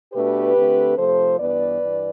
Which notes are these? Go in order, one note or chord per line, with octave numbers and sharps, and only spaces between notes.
B2 A3 D4 G4 B4
D3 A3 C4
C3 F3 A3 A4 C5
G2 E3 B3 B4 D5
G2 E3